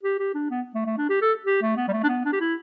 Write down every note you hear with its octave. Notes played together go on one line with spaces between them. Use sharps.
G4
G4
D4
B3
A3
A3
D4
G4
A4
G4
A3
B3
G3
A3
D4
B3
D4
G4
E4